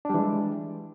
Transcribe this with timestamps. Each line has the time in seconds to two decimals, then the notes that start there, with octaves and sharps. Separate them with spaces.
0.05 D4
0.10 G3
0.14 E3
0.19 G#3